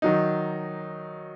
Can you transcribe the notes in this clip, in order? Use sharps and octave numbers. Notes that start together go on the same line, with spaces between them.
D#3 F#3 D#4